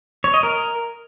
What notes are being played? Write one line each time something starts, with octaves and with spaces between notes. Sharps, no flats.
C#5
D#5
A#4